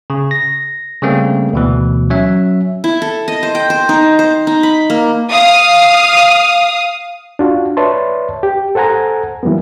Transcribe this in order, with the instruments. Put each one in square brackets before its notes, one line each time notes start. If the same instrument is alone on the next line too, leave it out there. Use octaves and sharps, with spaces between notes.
[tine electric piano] C#3
A#6
C#3 G3 A3 A#3 C4 C#4
D2 B2 E3
F#3 C#4 E5
[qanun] E4
A4
D#5
C5
G5
C5
D#4
C5
D#4
B5
A#3
[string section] F5 D#6
[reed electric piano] D4 F4 F#4
B4 C#5 D5 E5 A5 C6
G4
A4 C5 F#5 G#5 A#5
E3 F#3 G3 A#3 B3